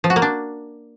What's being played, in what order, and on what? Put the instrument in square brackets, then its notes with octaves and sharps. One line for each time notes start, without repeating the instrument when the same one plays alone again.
[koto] F3
F#4
A#3
D4